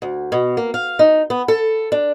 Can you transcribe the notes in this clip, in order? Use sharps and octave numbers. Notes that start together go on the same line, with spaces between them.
D2
B2
A#3
F5
D#4
B3
A4
D4